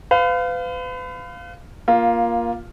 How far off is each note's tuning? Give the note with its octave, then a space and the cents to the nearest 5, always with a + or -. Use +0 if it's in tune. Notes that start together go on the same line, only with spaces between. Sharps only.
B4 +40 F5 +0
A#3 +15 F4 +0